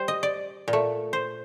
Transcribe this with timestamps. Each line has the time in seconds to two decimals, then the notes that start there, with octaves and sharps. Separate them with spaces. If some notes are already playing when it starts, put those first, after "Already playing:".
Already playing: G3 C5
0.08 D#5
0.23 D5
0.68 A#2
0.73 A3
1.13 C5